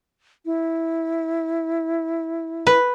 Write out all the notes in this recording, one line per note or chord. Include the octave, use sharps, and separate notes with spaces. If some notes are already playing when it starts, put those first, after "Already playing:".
E4
B4